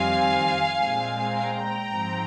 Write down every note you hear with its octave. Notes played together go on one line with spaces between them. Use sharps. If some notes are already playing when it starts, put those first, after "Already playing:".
Already playing: F2 D#3 G3 C4 F5 G#5
A#2 G#3 C4
G5 A#5
G#2 F3 C4